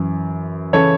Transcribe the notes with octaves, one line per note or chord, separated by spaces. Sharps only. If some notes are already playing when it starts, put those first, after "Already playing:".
Already playing: F#2 E3
C#3 E3 A4 C#5